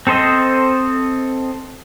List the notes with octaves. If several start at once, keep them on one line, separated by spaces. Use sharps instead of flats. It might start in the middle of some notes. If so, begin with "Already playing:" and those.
C4 A4 C5 D#5